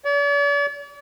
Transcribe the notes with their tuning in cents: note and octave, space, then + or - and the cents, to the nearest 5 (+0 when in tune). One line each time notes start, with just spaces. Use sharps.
D5 -45